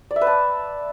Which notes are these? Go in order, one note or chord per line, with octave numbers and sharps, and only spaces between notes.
D5
E5
B4
A5